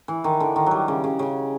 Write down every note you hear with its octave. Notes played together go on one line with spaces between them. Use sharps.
E3
D#3
D3
D#3
F#3 G3
C#3
C#3
C#3